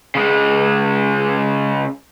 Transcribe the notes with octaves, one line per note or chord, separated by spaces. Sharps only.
C#3 G#3